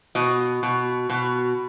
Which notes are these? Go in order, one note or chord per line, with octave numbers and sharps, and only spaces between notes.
B2 D#5
B2
B2